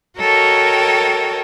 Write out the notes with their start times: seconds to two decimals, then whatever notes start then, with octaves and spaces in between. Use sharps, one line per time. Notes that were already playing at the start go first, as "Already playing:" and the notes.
0.19 F#4 A4 A#4 C#5 D#5 G5